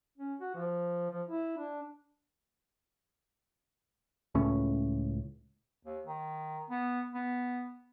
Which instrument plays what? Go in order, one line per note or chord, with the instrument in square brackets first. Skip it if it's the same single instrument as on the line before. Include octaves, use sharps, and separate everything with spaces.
[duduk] C#4
F#4
F3
F3
E4
D4
[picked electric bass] C#2 A2 C#4
[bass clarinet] D#2
D#3
B3
B3